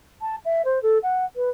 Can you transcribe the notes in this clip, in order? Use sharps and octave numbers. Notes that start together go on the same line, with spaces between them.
A5
E5
C5
A4
F#5
B4